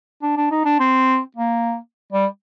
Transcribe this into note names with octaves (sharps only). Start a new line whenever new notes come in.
D4
D4
D#4
D4
C4
A#3
G3